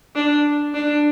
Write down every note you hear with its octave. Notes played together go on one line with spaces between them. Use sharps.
D4
D4